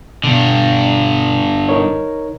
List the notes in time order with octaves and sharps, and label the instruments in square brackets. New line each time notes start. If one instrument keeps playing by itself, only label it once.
[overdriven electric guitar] G2 D3 [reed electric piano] B2
[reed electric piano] D#4 A#4 C#5